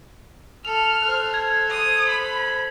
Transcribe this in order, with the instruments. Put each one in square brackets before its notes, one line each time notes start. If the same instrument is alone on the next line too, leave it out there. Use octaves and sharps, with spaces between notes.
[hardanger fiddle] A4 [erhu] F6 [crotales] F7
[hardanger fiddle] A4 C5 [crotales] F#6
[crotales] G#6
[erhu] D#6
B5